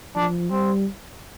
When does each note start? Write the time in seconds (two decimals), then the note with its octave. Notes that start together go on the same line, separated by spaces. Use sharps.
0.16 F3 D4
0.50 G3 C4